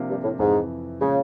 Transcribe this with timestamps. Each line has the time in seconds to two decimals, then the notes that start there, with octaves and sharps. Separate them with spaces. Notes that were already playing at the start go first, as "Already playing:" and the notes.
Already playing: C3 F3 A#3 D4 F4
0.09 G2
0.24 A2
0.39 F2 G#2 C3 E3
1.00 A#2 C#3 F3 G#3